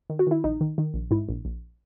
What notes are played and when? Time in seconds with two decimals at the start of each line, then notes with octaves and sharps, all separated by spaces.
0.10 D#3
0.19 F#4
0.27 D#3 E4
0.44 A#1 D#4
0.61 D#3
0.78 D#3
0.94 A#1
1.11 G#2 E4
1.29 A#1
1.45 A#1